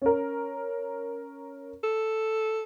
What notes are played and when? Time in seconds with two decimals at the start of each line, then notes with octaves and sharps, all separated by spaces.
0.02 C#4 A#4
1.84 A4